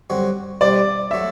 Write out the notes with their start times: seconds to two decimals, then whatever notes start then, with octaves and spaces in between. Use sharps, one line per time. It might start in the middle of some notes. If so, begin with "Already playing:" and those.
0.10 G2 D3 F#3 C4 F#4
0.61 B2 G3 C4 E4 D5
1.11 F#3 A3 E5